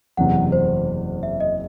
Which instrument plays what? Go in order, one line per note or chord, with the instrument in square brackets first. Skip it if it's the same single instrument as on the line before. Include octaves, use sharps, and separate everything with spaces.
[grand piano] F#1 E2 C3 E3 [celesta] F#5
[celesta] C5
E5
D#5